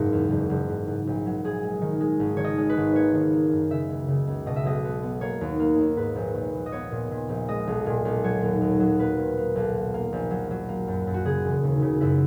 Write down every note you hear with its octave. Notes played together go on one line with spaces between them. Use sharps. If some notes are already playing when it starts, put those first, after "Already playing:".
Already playing: F#1 G#2 A#4
E2
F#1
F#1
G#2
G#2
A#1
F#3
A#1 G#4
G#3
D#3
G#3
G#1
D#3 C#5
D#5
G#3
B4
G#1
A#3 C#5
D#3
A#3
F#2
C#3 E5
C#2
C#3
C#2
B2 D#5
E5
B1 D#5
B3
B3
A#3 C#5
D#2
A#3
D#2
G#2 B4
A#1
A#1
A#1
D#5
B3 C#5
A#2
A#2
A#1
G#3 D#5
B1
A#2
B1
F#3 C#5
D#2
D#2
F#3
A#3 B4
A#2
A#3
B1
A#3
A#3
A#1
F#3
F#3
A#3
F#2
F#2
F#4
C#3 G#4
E1
D#2
C#3
F#2 E4